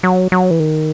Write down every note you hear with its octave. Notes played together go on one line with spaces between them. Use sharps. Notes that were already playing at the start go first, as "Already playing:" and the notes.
F#3
F#3
E3
D#3